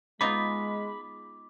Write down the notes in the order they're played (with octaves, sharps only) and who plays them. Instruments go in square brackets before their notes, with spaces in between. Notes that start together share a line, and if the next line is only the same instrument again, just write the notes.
[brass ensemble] G#3 [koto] B3 D#4 F4 [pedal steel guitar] B5 [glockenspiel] D6